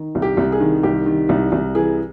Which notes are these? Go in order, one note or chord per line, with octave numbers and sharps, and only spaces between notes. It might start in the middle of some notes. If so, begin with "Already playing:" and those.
Already playing: D#3
C2
G4
C2
G#4
D#3
C2 G4
D#3
C2
C2
E3 G#4